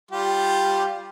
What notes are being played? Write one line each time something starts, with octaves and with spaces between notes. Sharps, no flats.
G3 F4 G4